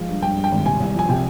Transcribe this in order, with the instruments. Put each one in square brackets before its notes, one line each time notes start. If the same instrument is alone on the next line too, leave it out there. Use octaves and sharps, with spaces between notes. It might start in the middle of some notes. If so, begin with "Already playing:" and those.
Already playing: [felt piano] F3 G#3 F5
G2
G2 G5
G2
G5
G#1
C3 G#5
C2
F3 G#5
C3 G5